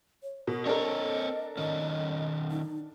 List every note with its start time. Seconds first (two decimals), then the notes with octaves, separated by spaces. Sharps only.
0.23 C#5
0.47 B2 A#4
0.66 C4 D4 A4 A#4 C#5 D#5
1.57 D#3 C#4 D#5
2.51 D#4